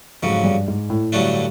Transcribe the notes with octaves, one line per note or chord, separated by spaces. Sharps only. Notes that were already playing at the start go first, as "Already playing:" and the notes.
F2 G#2 C#3 F#3
G2
G#2
A2
G2 D3 F#3 A3 D4